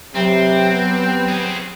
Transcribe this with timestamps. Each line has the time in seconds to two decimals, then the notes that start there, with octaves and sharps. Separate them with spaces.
0.15 C3 F#3 C4 G4 B4 G5
0.71 B3
1.28 C4 G#4